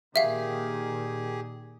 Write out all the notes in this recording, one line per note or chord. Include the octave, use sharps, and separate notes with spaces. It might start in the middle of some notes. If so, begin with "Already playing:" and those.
A#2 D#3 G4 G#4 E5 F5